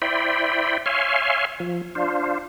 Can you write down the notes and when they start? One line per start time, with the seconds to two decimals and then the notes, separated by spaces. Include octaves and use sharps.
0.02 E4 C5 D5 G5 B5
0.86 C#5 E5 F5 G#5 C6
1.60 F3
1.95 D4 F4 C5